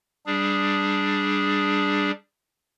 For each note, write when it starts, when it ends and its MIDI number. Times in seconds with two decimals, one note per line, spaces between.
0.26 2.11 55
0.26 2.11 62
0.26 2.11 68